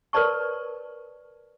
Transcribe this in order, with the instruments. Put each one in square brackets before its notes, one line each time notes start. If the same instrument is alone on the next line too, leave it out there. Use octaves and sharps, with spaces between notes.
[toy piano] A#4 B4 C#5 D5 A5 C#6